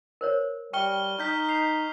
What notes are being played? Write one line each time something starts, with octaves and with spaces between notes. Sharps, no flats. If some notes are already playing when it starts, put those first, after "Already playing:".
A#4 C5 C#5
G3 G5 C#6 F6 G7
D#4 F6 G6 B6
C7 F7